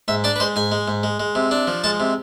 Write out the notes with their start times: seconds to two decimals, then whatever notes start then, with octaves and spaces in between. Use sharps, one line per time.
0.08 G#2 E5
0.24 D4 D5
0.36 B4
0.40 G#3 C5
0.56 G#2 G#5
0.72 G#3
0.88 G#2
1.03 G#3
1.20 G#3
1.35 C3
1.51 D4
1.67 F3
1.84 G#3 A5
2.00 C3